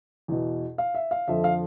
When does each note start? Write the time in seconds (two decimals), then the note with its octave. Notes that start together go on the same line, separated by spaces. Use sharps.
0.28 E2 B2
0.78 F5
0.95 E5
1.11 F5
1.28 F2 D3 F3 E5
1.44 F5